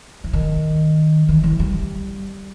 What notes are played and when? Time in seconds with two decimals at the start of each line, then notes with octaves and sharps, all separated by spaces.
0.24 E3
0.33 D#3
1.29 E3
1.44 E3
1.60 G3